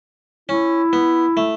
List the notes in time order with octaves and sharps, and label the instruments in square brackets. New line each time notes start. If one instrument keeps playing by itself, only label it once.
[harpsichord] C#4 [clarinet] E4
[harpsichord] B3
A3